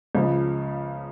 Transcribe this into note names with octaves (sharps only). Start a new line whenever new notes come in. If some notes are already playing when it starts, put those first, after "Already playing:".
C#2 C#3 F3